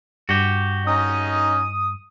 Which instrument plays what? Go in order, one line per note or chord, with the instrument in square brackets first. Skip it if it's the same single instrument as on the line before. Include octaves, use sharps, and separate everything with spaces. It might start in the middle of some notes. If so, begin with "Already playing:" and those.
[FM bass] G2 [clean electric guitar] F#4 G4
[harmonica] C#4 D#4 D#5 [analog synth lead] D#6